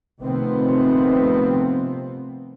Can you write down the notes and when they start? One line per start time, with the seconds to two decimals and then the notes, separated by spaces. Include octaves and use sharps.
0.21 C3 D#3 F3 A3 B3 C4